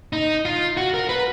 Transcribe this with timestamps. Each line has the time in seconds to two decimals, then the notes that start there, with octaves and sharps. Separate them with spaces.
0.13 D#4
0.45 F4
0.77 F#4
0.94 A#4
1.09 B4